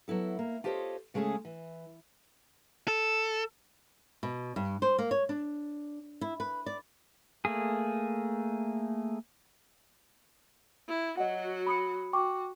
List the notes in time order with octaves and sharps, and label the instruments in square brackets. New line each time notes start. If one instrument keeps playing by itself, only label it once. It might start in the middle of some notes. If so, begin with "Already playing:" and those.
[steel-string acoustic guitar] F#3 B3 E4 A4
A#3
F4 G4 A4 C5 C#5 D#5
C#3 G#3 A3 C#4 G#4
E3
[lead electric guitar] A4
[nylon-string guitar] B2
G2
C5
A#3
C#5
D4
E4
B4
D5
[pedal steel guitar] A3 A#3 G#4
[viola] E4
[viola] F#3 F#4 [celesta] D#5 F#5
[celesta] B5 D#6 C#7
[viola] F#4 [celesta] G5 C#6 D6